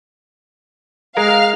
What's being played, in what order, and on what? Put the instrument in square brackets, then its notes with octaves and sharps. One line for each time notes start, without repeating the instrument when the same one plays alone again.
[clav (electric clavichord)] G#3 A#4 [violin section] F5 F6